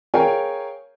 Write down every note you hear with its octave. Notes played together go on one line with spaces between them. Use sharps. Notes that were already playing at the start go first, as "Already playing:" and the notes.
G#4 A#4 C#5 F5 G5 G#5